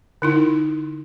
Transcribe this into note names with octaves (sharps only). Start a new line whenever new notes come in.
D3 D#4 E4